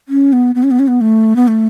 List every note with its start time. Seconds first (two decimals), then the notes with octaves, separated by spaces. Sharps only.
0.09 C#4
0.33 B3
0.55 B3
0.63 C#4
0.71 B3
0.79 C#4
0.88 B3
1.01 A3
1.36 B3
1.48 A3